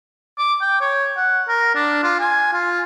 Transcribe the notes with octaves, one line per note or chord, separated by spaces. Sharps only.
D6
G5
C#5
F#5
A#4
D4
F4
G#5
F4